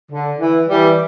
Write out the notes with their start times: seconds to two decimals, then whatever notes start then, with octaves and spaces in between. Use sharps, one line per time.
0.11 D3
0.39 E3
0.69 E3 G3